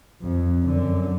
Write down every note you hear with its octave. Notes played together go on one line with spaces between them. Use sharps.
F2
F#2 D3